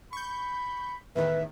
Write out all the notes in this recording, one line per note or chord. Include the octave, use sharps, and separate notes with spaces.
B5 C#6 G6
E2 A2 D#3 B4 E5